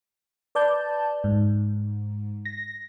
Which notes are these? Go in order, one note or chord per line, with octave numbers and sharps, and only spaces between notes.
B4 D5 A5 G6
G#2
A#6